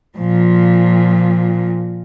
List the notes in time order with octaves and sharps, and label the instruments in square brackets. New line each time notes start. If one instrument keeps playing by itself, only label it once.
[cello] A#2 F3